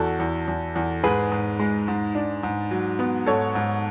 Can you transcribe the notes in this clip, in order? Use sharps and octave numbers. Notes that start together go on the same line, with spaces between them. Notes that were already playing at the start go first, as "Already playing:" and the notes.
Already playing: E2 F#4 A4
E2
E2
E2
G#2 G#4 B4
G#2
G#3
G#2
D4
G#2
F#3
B3
G#2 A4 C#5
G#2